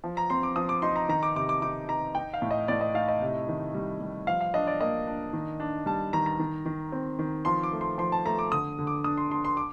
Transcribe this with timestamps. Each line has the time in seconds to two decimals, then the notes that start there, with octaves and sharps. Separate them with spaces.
0.04 F3
0.17 A#5
0.30 C4 C6
0.43 D6
0.56 F3 D#6
0.69 D6
0.82 D#4 C6
0.96 A#5
1.09 D#3 A#5
1.23 D6
1.36 C3 D6
1.49 D6
1.62 D#4 D6
1.89 D#4 A#5
2.15 D#4 G5
2.34 F5
2.42 A2
2.51 D#5
2.68 A2 D5
2.81 D#5
2.94 D#4 F5
3.08 D#5
3.21 C3
3.48 D#3
3.74 G3
4.00 G3
4.27 F3 F5
4.41 F5
4.54 D4 D#5
4.67 D5
4.81 A#3 D#5
5.07 D4
5.33 D#3
5.60 D4
5.86 G3 A5
6.13 D#3 A#5
6.26 A#5
6.39 D#3
6.66 D#3
6.92 C4
7.19 D#3
7.45 F3 C6
7.63 D6
7.73 A3
7.81 C6
7.98 F3 C6
8.12 A5
8.25 A3 A#5
8.39 D6
8.52 D3 D#6
8.79 D3
8.87 D6
9.04 D4 D#6
9.17 C6
9.31 D4 C6
9.45 C6
9.57 D6